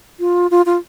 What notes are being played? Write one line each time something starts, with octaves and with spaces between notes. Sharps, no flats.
F4
F4
F4